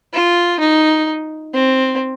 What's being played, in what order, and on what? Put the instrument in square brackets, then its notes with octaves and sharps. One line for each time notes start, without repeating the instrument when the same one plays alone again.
[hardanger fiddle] F4
D#4
C4